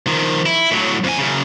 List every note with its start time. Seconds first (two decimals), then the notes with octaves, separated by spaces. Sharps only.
0.07 D#3 F3
0.46 E4
0.72 A2 F#3
1.04 F2 G#5
1.17 F#2 C#3